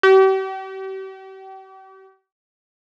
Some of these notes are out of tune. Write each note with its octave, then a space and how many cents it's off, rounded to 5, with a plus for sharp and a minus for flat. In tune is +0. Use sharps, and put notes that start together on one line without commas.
G4 -40